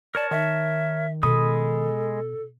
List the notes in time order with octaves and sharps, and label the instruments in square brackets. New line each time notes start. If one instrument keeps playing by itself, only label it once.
[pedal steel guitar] A#4 C#5 A5 [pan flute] D5
[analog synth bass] D#3 [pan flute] E5
[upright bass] B2 [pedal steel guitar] G#3 B5 D#6 [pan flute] A4